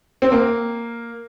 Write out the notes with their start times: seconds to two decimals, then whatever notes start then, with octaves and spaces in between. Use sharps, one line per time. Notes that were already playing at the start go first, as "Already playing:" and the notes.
0.22 C4
0.32 A#3